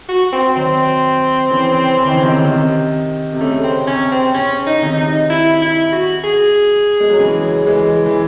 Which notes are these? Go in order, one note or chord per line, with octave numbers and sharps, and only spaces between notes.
F#4
C4
D#3 F#3 C4
C#3 E3
E3
D#3
C#3
C3 D#3
C3 D#3
C3
C#3 A3
C4
C3 C#4
C4
C#3 C#4
D#4
C3 D#3
D#4
E4
E4
F#4
G#4
G#3
F#3
C#3 E3
E3 G#3
E3